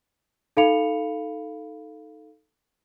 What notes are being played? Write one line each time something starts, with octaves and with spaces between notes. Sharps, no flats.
D#4 A4 F5 B5 C#7 F7